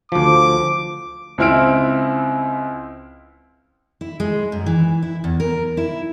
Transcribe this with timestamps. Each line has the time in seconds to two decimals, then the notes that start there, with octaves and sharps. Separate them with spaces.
0.12 D2 F3 D6
1.38 C#2 C4 E4 F6 D7
4.01 E4
4.20 G#3
4.52 F#2
4.66 E3
5.02 E4
5.24 E2
5.40 A#4
5.77 E4